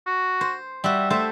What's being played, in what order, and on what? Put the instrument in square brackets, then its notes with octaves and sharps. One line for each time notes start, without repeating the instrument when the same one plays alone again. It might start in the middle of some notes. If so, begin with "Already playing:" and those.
[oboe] F#4
[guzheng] C5
[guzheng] G3 F#4 [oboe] E5
[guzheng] A3 C5 A5 [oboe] E5